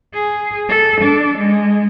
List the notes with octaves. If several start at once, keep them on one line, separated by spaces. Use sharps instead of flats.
G#4
A4
D4
G#3